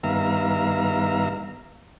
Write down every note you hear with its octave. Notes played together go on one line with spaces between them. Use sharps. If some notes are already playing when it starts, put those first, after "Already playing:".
G2 D#3 B3 E5 F5 A#5